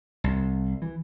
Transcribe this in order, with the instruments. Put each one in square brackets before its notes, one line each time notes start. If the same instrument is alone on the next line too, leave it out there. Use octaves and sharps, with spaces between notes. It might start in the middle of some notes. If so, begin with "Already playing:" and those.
[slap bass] C2
E3